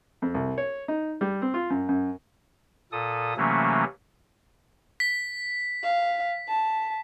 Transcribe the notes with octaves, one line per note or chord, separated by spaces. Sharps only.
F2
C2
C#5
D#4
G3
C4
F4
F#2
F#2
A#2 A4 D#6
C3 E3 F#3 A3 A#3 C#4
B6
F5
A5